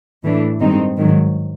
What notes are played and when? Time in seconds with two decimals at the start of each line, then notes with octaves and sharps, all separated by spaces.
0.24 A2 E3 A3 D4
0.60 G2 D#3 G#3 C4 D#4
0.97 G#2 D#3 F#3